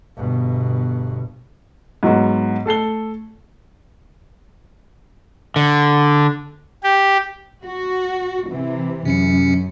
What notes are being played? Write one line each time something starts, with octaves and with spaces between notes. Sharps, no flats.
G1 B2
G#2 F#3 B3 F#4
A3 A4 C7 G7
D3
G4
F#4
C3 E3
F#2 C3 C#4 C#7